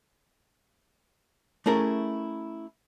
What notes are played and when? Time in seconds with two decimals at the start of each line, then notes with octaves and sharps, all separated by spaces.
1.66 A3 C#4 E4 G#4 A#4